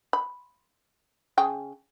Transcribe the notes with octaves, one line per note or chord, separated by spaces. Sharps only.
B5
C#3 G#4 G5